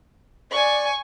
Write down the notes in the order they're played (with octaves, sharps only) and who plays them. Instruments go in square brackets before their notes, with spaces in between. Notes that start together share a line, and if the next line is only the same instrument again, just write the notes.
[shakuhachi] D5 [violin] G#5 C#6